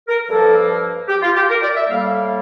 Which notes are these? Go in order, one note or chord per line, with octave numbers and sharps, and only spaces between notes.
A#4
G2 F3 A#3 A4
G4
F4
G4
A#4
D5
E5
A2 G3 A#3 F5